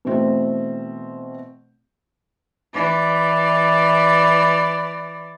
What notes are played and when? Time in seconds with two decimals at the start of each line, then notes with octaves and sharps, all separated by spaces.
0.05 B2 E3 A3 C4
2.74 E3 D5